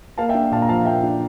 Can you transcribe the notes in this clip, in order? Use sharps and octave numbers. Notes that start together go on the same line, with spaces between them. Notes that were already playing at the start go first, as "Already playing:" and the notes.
A#3 F5 A5
E5 G5
D4
A#2 F5 A5
A#5
F3 F5 A5
A#3 E5 G5
D4